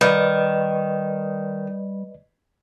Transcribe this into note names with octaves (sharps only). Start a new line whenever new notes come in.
D#3 G3 B4 D5 D#5